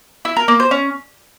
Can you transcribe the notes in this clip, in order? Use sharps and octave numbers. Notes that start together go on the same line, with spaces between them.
E4
A#4
A#3
C5
C#4